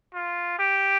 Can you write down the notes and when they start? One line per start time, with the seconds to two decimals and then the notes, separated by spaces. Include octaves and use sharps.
0.14 F4
0.59 G4